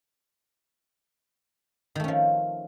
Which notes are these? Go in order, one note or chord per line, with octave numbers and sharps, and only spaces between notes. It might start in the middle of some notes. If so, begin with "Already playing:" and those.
D#3 F3 A3 C#4